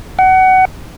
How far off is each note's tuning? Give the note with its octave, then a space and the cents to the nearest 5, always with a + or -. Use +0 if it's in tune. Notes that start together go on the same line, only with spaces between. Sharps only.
F#5 +25